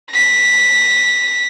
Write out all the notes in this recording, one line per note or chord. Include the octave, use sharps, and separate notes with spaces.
A#6 B6